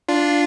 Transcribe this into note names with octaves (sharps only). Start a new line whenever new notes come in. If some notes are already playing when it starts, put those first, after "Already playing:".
D4 F4